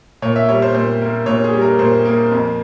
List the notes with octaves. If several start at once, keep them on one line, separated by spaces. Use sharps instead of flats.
A#2 C#5
E5
G3 C#5
C5
A#2 C5
A#3
A#2 C#5
G#4
G3
A#4
A#2 C5
A#3
F2